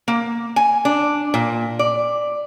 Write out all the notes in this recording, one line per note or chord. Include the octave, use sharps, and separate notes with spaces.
A#3
G#5
D4
A#2
D5